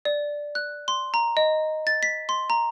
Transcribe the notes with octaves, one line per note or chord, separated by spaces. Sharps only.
D5
F#6
C6
A#5
D#5
A6
B6
C6
A#5